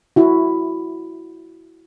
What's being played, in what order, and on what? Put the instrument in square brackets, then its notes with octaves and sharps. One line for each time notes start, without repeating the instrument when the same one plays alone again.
[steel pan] E4 F#4